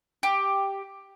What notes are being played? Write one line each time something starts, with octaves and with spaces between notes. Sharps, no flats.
G4